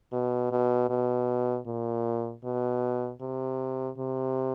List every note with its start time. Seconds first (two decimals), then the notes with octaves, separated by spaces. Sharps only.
0.12 B2
0.52 B2
0.90 B2
1.67 A#2
2.44 B2
3.21 C3
3.97 C3